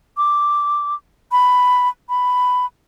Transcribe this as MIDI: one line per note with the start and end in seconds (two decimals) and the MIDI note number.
0.17 0.95 86
1.32 1.89 83
2.09 2.66 83